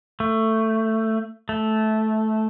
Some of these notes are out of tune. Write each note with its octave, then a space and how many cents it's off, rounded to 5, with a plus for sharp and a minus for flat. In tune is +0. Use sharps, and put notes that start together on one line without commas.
A3 +15
A3 -10